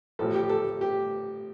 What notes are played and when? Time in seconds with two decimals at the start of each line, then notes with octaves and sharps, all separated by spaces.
0.19 A1 A2 F3 A4
0.34 G4
0.50 A4
0.81 G4